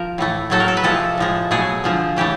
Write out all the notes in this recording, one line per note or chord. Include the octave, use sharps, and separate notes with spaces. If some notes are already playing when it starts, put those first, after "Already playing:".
Already playing: F3 A#4
A2 E3 A3
A2 F#3 A3 A4
A#4
A4
B4
C3 F3 G#3 A4
A2 F3 G#3
B2 F#3 A3 G#4
D3 F3 G#3
C#3 E3 A3 G4